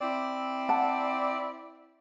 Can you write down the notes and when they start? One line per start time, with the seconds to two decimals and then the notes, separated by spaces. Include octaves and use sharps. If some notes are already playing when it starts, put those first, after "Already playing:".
0.01 C4 E4 D5
0.69 F#5 A5